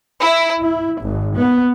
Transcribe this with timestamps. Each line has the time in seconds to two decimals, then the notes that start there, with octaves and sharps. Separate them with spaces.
0.21 E4
0.63 E4
1.02 G#1
1.38 B3